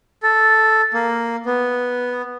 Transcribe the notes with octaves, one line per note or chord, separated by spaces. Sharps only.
A4
A#3
B3